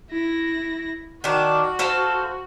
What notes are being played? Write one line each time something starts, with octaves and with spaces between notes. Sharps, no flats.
E4 A#6
D#3 D4 F#4
F4 A4 C5